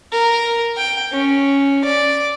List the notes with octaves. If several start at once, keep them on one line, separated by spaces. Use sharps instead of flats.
A#4
G5
C#4
D5